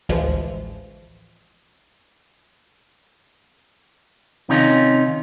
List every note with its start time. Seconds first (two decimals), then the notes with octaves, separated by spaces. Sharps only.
0.09 A1 D2 E3 F3 G#3
4.49 C3 D#3 C#4 D#4 F4